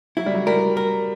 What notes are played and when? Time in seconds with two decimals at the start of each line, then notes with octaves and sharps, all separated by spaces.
0.17 F#3 E4
0.26 G3
0.34 F#3
0.47 G3 A#4
0.77 A#4